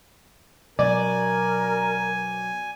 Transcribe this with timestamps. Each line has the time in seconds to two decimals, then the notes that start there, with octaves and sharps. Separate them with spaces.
0.79 B2 F#3 A#4 D5 G#5